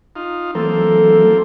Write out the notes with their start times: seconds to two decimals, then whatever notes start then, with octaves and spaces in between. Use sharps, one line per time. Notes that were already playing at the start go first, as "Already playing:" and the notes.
0.16 D#4 F4
0.55 E3 F#3 A3 A#3 C4 A4